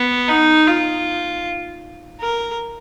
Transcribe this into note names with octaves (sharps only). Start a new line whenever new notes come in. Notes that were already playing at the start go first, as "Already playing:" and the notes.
Already playing: B3
D#4
F4
A#4